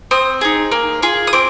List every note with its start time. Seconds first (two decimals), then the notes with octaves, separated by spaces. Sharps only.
0.11 C4 D#6
0.41 D#4 G#4
0.72 A#3
1.02 F4 G#4
1.27 D#6
1.33 C4 D6